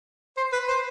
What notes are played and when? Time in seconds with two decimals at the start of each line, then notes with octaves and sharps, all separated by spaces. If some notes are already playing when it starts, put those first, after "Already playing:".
0.37 C5
0.52 B4
0.68 C5